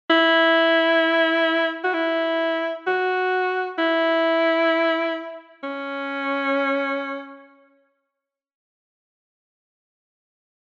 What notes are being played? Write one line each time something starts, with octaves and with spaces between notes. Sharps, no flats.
E4
F#4
E4
F#4
E4
C#4